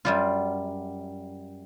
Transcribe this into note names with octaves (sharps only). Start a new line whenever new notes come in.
F#2 G3 F4